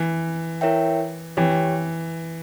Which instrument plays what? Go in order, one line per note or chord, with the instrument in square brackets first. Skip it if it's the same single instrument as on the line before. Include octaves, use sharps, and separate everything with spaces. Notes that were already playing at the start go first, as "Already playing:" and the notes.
Already playing: [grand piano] E3
[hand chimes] E4 A#4 C#5 E5 G5
[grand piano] E3 [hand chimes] G4 C#5 G5